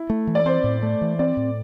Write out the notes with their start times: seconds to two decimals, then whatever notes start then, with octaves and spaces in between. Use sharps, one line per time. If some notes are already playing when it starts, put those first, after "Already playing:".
Already playing: E4
0.10 A3
0.27 E3
0.35 D5
0.45 C4 C5
0.64 A2
0.83 A3
1.01 E3
1.19 C4 D5
1.37 A2